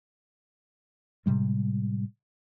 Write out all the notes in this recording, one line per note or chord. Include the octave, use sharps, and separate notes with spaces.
A2 C3 G3 G#3